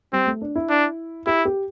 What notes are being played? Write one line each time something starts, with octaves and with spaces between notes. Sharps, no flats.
G3 C4
A3
D4
E4
D4
E4 G4
G4